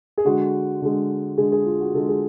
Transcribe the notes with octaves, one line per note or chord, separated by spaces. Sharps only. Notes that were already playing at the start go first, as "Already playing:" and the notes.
G#4
D3 G#3 F#4
D3 G#3
D3 G#3 G#4
G#4
F4
F#4
D3 G#3 A4
G#4